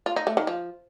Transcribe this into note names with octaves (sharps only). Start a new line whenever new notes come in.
F4
D#4
A3
D#3
F3